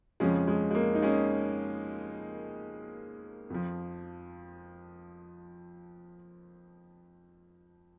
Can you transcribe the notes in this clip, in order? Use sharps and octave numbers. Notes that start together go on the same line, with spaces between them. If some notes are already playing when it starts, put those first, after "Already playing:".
F2 C#3 F3 G#3 C#4
G#3
G#3
A#3
D#4
G#3 C#4
F2 F3